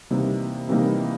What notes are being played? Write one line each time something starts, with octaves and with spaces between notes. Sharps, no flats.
C3 E3 G3 A#3 D#4
C3 E3 G3 A#3 D#4